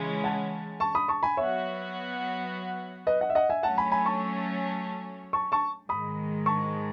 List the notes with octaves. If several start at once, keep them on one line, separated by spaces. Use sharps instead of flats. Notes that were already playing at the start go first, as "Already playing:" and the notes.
Already playing: C#3 E3 G#3 C#4
F#5 A5
A5 C#6
B5 D#6
A5 C#6
G#5 B5
F#3 B3 F#4 C#5 E5
B4 D#5
D#5 F#5
E5
D#5 F#5
E5 G#5
F#3 A3 C#4 F#5 A5
G#5 B5
G#5 B5
A5 C#6
A5 C#6
A5 C#6
G#2 D#3 G#3 B5 D#6
A5 C#6